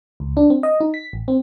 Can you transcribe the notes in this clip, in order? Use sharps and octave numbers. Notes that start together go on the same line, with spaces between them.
C#2
D4
C4
D#5
D#4
B6
A1
C4